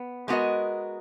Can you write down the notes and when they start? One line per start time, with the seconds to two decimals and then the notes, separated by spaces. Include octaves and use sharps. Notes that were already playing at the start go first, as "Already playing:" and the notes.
Already playing: B3
0.28 G#3 B3 F#4 A#4 D#5